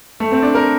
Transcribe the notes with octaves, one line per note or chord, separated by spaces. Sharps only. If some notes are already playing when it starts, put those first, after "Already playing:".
A3
C4
D4
A#4